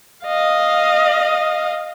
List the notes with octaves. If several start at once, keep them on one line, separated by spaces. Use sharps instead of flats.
D#5 F5